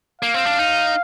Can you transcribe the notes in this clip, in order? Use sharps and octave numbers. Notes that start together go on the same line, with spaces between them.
A#3 F5
C4
D4
D#4